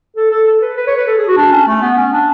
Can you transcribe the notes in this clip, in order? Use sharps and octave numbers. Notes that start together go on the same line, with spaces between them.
A4
A4
A4
B4
B4
C#5
B4
A4
G#4
F#4
D4
C#4
A3
B3
C#4
D4